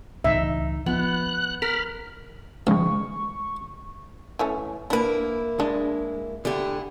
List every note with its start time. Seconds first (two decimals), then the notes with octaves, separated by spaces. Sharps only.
0.24 C#2 A2 E3 D#4 E5
0.86 F3 B3 F#6
1.62 A#4 B5 F6
2.67 C#2 D#3 F3 G#3 C#6
4.39 E3 A3 C#4
4.90 A#3 D4 E4 B4
5.60 G#3 D4
6.45 D3 A3 E4 G4 G#4